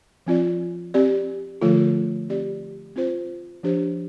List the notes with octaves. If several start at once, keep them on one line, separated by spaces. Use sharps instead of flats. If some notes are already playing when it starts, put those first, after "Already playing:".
F3 C4 F4 D5
C4 G4 D5
D3 F3 A3 F4 A4
C4 G4 D5
C4 F4 C5
F3 D4 G4 C5